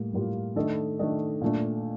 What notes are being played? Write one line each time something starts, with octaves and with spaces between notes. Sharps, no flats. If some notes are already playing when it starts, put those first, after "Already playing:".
Already playing: A2 G3 A#3
A2 G3 A#3 F4
D#3 A3 D4 A4 D#5
D#3 A3 D4 A4 D#5
A#2 A3 D4